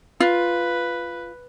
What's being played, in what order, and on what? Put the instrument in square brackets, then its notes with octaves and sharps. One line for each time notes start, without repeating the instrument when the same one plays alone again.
[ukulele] F4 [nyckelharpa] B4